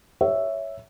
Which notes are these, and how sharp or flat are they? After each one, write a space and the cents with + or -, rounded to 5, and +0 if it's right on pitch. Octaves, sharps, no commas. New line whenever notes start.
C#5 +5 E5 +0